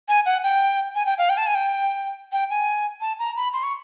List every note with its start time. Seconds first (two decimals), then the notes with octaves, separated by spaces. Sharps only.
0.09 G#5
0.26 F#5
0.43 G5
0.95 G#5
1.06 G5
1.18 F5
1.29 G5
1.37 A5
1.47 G#5
1.55 G5
2.32 G5
2.50 G#5
3.01 A5
3.19 A#5
3.36 B5
3.53 C6
3.63 C#6